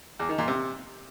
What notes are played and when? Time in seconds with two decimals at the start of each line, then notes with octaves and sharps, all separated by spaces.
0.19 E2
0.29 D#3
0.38 A#2
0.48 C3